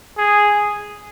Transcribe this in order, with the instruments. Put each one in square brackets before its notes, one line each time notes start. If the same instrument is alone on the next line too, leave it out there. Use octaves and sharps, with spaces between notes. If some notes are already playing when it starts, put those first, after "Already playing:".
[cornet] G#4